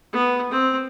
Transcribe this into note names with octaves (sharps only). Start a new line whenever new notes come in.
B3
C4